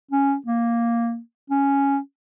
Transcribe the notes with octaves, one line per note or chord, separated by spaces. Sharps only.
C#4
A#3
C#4